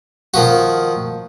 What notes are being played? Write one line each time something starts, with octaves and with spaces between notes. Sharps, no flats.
D#3 F3 F#4